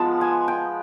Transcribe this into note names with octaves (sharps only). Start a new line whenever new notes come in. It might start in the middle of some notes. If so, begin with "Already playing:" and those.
Already playing: F3 G#3 B3 A5
G#5
G5